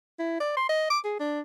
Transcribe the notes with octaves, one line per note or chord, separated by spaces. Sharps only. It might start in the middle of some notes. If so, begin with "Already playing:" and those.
E4
D5
C6
D#5
D6
G#4
D4